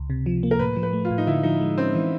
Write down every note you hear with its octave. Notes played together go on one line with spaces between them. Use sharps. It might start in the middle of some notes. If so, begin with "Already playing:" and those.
Already playing: C#2
C3
F3
A#3
A#4
A2 B4
F3
B4
A3
F4
A2
D#4
D3 E4
F3 D#4
G#3
C4 C#4
E3